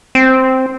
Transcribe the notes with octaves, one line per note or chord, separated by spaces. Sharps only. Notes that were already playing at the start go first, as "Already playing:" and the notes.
C4